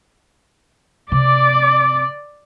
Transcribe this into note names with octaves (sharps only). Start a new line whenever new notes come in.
C3 D5 D6